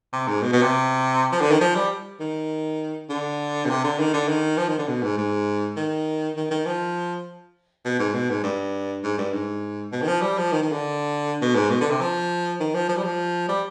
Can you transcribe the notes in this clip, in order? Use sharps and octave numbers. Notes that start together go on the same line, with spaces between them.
C3
G#2
B2
B2
C3
F3
D3
D#3
F3
G3
D#3
D3
B2
C3
D3
D#3
D3
D#3
F3
D#3
D3
B2
G#2
G#2
D#3
D#3
D#3
F3
B2
G#2
B2
G#2
G2
G#2
G2
G#2
B2
D#3
F3
G3
F3
D#3
D#3
D3
B2
G#2
B2
D3
C3
F3
D#3
F3
F3
G3
F3
G3